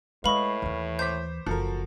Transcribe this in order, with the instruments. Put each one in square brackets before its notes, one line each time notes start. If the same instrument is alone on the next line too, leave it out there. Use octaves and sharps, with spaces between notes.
[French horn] A2 [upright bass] G#3 [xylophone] B4 B5 C#6 [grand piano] D#5 F5
[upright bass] D#2 E3
[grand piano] C5 D6 B6 [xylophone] G6
[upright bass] F#1 [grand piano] F3 A4 A#4 [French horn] F#4